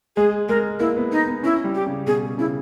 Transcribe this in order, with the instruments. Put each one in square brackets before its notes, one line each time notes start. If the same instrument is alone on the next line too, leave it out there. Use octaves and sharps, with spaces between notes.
[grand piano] G#3 [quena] G#4
[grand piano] G#3 [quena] A#4
[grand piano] A#3 [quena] E4
[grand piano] B3
[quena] D#4
[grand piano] B3
[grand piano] C#4 [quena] E4
[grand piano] G3
[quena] G4
[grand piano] C#3
[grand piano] B2 [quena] G#4
[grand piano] C#3 [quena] E4